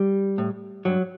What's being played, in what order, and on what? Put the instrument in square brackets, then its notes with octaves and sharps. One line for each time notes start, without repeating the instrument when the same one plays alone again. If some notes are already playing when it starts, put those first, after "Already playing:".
Already playing: [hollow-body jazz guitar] G3
A2
G2 F#3